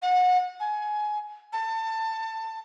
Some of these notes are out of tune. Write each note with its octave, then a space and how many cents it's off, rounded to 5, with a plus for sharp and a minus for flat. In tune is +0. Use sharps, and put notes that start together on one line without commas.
F#5 -30
G#5 +20
A5 +25